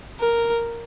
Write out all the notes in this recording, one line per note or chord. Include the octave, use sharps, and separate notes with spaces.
A#4